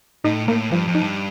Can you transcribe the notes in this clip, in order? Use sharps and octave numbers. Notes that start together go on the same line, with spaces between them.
A2 D#4
A2 A#3
G2 F3
F2
D#4
G2